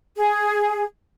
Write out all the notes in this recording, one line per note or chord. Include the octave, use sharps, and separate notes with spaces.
G#4